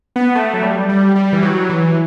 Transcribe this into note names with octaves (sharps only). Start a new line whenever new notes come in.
B3
A3
F#3
G3
G3
G3
E3
F#3
E3